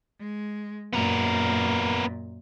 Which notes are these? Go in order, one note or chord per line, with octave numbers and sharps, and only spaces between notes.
G#3
F#2 A#2 B3 A#4